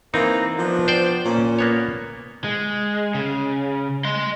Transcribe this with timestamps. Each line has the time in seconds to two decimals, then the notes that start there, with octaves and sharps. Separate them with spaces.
0.14 E3 A#3 C4 D#4 A#5
0.58 F3 B3 D4
0.88 C5 D5 G5
1.25 A#2 C#4
1.59 A#3 B3 C#5
2.44 G#3
3.15 C#3
4.05 D#5 C6